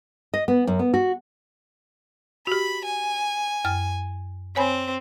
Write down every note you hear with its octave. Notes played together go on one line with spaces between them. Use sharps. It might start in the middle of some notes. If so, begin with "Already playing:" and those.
D#5
B3
F#2
B3
F#4
F#4 G4 B5
G#5
F#2 F6
C4 C#5 G#5 B5